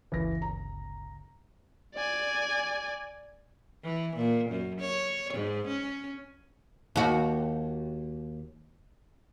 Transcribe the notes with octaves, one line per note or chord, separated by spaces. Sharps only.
G1 D2 C#3 E3 A#6
A#5
D5 G#5
E3
A#2
F#2
C#5
G#2
C#4
D#2 F#4